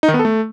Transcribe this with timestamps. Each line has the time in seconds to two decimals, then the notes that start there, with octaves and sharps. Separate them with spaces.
0.03 D#4
0.08 D#3
0.14 B3
0.19 A4
0.25 A3